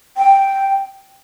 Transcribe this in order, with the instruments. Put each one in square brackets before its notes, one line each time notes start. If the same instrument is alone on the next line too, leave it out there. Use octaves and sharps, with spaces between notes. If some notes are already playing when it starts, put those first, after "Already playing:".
[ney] G5